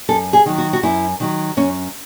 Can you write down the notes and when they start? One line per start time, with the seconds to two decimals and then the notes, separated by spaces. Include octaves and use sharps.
0.09 F#2 A4
0.33 G#4
0.46 D#3 F#3
0.58 F#4
0.73 F#4
0.83 F#2 E4
1.20 D#3 F#3
1.57 F#2 C#4